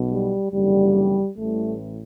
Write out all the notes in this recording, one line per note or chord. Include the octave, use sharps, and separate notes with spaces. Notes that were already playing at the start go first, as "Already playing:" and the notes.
Already playing: B1 B2
G3
F#1 E2 D3 G3
A1 A2 E3 G3 A3